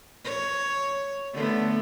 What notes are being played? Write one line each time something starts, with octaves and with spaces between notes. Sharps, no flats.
C#5
D3 A3 B3